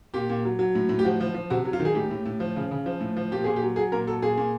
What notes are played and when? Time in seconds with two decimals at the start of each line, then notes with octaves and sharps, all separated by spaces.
0.14 A#2 G4
0.30 A#2
0.45 F#3
0.59 F#3
0.75 A2
0.89 A2
0.99 G4
1.04 F3 F#4
1.20 F3
1.34 F3
1.50 C3 F#4
1.65 F#3
1.73 F4
1.80 D#3
1.85 G#4
1.95 A2 G4
2.11 A2
2.26 A2
2.40 F3
2.56 C#3
2.71 C#3
2.86 F3
3.01 A2
3.17 F3
3.32 A#2 G4
3.44 A#2 G#4
3.56 G4
3.62 F#3
3.76 F#3 G#4
3.92 A#2 A#4
4.07 F#3 A4
4.22 A#2 G#4
4.38 A#2